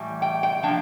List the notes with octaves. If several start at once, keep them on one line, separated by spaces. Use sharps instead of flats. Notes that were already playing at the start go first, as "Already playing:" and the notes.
Already playing: A2 E3 G3
G5
G5
F3 A#3 D4 G5